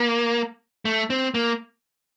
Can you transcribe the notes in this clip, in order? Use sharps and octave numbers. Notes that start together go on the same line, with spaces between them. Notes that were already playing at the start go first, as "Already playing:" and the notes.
Already playing: A#3
A3
C4
A#3